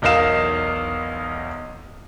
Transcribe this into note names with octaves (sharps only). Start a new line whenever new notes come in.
B1 E2 D#4 A#4 F5 E7